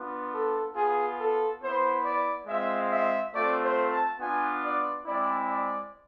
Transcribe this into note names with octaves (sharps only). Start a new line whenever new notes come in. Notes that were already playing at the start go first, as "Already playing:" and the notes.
Already playing: B3 D4 F4
A4
B3 F4 G#4
A4
B3 E4 C5
D5
G#3 C4 F4 E5
E5
A3 C4 F4 D5
C5
A5
B3 D4 F4 G#5
D5
G#3 C4 E4 D5
D5